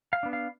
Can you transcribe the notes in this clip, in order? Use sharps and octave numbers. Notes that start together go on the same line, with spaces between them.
F5
B3 D4
F5